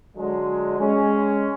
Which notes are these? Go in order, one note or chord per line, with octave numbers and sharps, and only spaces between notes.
D3 F#3 G#3
G#3 C#4